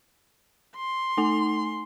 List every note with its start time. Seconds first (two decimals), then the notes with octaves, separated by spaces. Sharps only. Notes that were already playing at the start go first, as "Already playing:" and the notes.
0.76 C6
1.17 A3 D#4 G#5